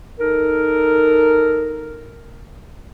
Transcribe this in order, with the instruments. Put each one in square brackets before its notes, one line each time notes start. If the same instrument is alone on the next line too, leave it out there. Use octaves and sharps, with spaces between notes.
[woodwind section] D#4 A4 A#4